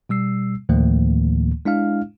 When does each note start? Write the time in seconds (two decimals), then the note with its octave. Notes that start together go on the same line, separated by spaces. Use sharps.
0.09 B2 G3 E6 C7
0.69 D2 A2 D#3 F3 A3 A#3
1.65 G#3 D4 E4 F5 F6